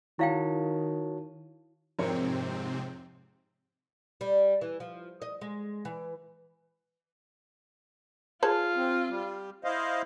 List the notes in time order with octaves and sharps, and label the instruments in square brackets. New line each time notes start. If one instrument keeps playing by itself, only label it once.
[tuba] D#3 [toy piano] E4 F5 G5 [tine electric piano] F#4 C#5 A5
[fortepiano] F2 A#4 C#5 [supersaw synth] G#2 C3 C4
[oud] G3
E3
F3
D#5
G#3
E3
[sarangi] F4 [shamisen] G#4 C#5 A5
[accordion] C4
G3
[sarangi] E4 [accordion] C5 D#5 F5